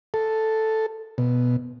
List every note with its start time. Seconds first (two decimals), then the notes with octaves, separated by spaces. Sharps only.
0.14 A4
1.18 B2